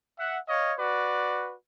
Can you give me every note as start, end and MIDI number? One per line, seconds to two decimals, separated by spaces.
0.18 0.39 76
0.18 0.39 78
0.48 0.73 73
0.48 0.73 75
0.48 0.73 77
0.78 1.54 66
0.78 1.54 71
0.78 1.54 74